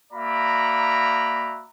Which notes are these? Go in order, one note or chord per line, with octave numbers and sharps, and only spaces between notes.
A#3 F#4 D5 E5 A#5 B5